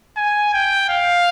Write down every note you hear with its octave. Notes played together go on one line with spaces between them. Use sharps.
G#5
G5
F5